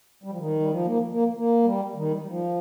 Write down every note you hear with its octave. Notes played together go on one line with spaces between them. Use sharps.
G3
F3
D#3
G3
F3
A#3
A#3
A#3
G3
D#3
G3
G3
F3